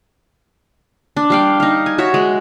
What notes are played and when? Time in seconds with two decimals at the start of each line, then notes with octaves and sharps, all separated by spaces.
1.17 D4
1.30 G3 F5 G5
1.60 D#4 F5
1.86 G#5
1.98 F#4 C#5 E5
2.14 G#3